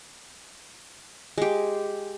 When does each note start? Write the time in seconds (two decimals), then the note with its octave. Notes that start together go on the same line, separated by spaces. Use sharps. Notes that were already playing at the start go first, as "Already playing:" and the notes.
1.38 G#3 G4